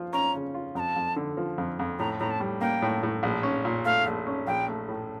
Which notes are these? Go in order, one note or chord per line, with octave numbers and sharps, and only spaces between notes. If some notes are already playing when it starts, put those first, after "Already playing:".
Already playing: F3 F4
C#4 A#5
C#3
F4
F2 A5 A#5
F2
D3
F3
F2
F2
A2 A#5
A2 A#5
A5
G3
A#3 G5
A2
A2
A#1
C#4
A#2
A3 F5
A#1
C#4
A#1 G5
A3
A2